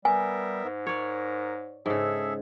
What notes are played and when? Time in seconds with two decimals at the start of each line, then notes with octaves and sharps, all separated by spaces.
0.05 G3 B3 A#4 E5 G#5
0.64 G#2
0.86 A#4 C#5 D5
1.86 G#2 C#3 G#4 A4 E5